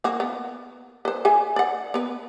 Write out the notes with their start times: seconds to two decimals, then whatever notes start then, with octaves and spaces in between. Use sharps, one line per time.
0.04 A#3 F#4
0.20 B3
1.05 B4 C5
1.25 G#4 E5 G#5
1.56 D5 F#5
1.94 B3 B4